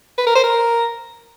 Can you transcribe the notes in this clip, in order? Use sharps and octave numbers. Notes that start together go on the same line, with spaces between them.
B4
A#4
C5
A#4